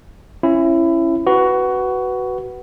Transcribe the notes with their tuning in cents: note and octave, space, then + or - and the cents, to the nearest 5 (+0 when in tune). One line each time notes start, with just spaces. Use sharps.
C#4 -20 E4 +20
F#4 +15 B4 +0